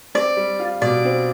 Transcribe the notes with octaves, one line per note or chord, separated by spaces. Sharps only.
C4 D5
G3
F4
B2 D5
C4